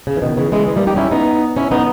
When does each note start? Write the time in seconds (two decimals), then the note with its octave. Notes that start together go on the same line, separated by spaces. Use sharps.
0.07 C#3
0.17 E3
0.22 B2 D#3
0.37 C#3 E3
0.52 E3 G#3
0.67 E3 G#3
0.76 G3 A#3
0.87 D#4 G4
0.96 C#4 E4
1.11 B3 D#4
1.56 C#4 E4
1.71 B3 D#4